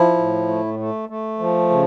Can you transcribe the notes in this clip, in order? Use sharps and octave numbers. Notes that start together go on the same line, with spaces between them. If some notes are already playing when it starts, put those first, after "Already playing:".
Already playing: F3 E4
A2
A3
A3
A3
F3
C#3